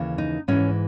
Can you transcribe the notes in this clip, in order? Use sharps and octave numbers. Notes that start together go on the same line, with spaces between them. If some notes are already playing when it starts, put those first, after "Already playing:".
Already playing: D#2 C#3 E3
D#4
G#2 E3 C#4